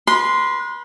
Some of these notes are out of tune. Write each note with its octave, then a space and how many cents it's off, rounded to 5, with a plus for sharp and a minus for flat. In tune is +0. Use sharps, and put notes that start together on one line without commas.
B4 -35 C6 -10